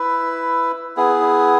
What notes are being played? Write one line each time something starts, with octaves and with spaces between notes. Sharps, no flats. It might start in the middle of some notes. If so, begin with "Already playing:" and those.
Already playing: E4 B4 E5
B3 E4 G#4